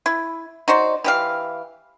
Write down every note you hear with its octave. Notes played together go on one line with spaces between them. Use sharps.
E4
D#4 F#4 C5 D5
E3 G4 F5